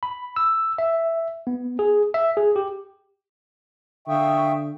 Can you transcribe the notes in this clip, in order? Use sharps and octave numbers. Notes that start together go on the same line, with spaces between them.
B5
E6
E5
B3
G#4
E5
G#4
G4
D3 E5 F5 G5 C#6 D#6